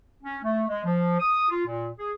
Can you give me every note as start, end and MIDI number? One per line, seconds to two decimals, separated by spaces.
0.23 0.38 61
0.43 0.63 57
0.68 0.82 56
0.85 1.19 53
1.20 1.49 87
1.50 1.65 65
1.66 1.87 46
1.98 2.12 68